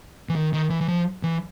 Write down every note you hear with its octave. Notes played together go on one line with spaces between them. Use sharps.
E3
D#3
D#3
E3
E3
F3
E3